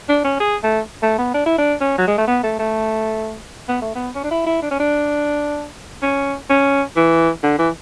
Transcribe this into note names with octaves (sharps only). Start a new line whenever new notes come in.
D4
C#4
G#4
A3
A3
B3
D4
E4
D4
C#4
F#3
G#3
A3
B3
A3
A3
B3
A3
B3
C#4
D4
E4
E4
D4
C#4
D4
C#4
C#4
E3
D3
E3